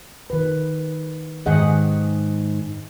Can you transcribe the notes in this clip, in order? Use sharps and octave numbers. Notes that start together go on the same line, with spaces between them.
D#3 B4
G#2 D#3 G#4 D#5 F#5